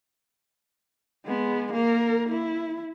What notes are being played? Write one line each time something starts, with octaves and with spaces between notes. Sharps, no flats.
G#3 B3
A#3 A#4
E4